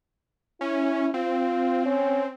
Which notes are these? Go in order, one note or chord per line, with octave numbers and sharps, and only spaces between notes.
C#4 E4
C4 F4
C#4